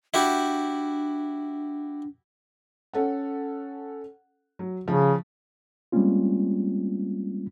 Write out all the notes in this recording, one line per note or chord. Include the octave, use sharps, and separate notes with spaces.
D4 E4 F#4 G4
C#4 A4 F#5
F#3
C#3 F3
G3 G#3 A#3 C4 C#4 F4